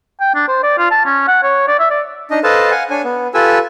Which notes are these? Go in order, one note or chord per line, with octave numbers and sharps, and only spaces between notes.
G5
D4
C5
D5
F4
A5
C#4
F#5
C#5
D5
E5
D5
D4 D#4 D#5
A4 B4 C5 D#5 F5 A5
F5 F#5 G#5
D4 C#5 G#5
B3
F4 G4 A4 B4 G#5 E6